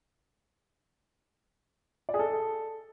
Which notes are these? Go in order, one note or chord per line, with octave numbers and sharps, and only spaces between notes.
D5
G#4
A4